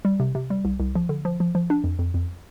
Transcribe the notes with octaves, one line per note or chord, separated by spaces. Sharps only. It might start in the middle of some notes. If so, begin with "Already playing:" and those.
G3
C3
C3
G3
C2
C2
F3
D3
F3
F3
F3
D4
F2
F2
F2